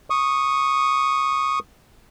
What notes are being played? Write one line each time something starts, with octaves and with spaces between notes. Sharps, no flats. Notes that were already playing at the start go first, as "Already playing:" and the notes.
C#6 D#6